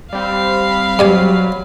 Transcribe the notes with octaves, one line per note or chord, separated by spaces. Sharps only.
G3 C4 F5 B5
G2 F#3 D5 G#5